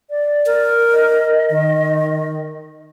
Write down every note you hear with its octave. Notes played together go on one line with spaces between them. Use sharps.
D5
A#4
D#5
D#3